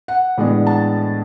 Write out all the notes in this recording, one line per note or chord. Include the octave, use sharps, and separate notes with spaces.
F#5
A2 E3 G#3 B3 D4
A5